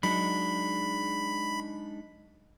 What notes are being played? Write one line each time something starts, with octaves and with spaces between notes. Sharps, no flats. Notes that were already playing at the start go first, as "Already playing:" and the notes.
F#3 G#3 D4 D#4 B5